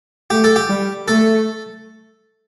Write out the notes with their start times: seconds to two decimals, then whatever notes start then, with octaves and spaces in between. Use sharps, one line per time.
0.30 A3 G4
0.44 A4
0.56 G4
0.69 G3
1.07 A3 A4